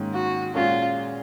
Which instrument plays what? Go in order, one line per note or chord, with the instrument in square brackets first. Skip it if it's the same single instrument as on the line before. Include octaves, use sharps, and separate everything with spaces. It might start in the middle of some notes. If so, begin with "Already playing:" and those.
Already playing: [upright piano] G#2 D#3 A#3 C#4
[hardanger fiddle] F#4
[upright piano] A#2 G#3 C#4 F#4 [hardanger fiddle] F4